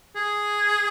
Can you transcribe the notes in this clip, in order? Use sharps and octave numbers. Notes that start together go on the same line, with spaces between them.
G#4